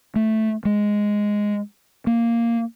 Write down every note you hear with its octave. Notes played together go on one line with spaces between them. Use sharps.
A3
G#3
A#3